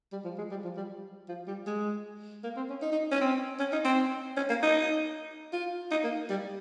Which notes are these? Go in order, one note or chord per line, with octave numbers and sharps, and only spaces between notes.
G3
F3
G#3
G3
F3
G3
F3
G3
G#3
A#3
C4
C#4
D#4
D#4
C#4
C4
C#4
D#4
C4
C#4
A#3
D#4
F4
D#4
A#3
G3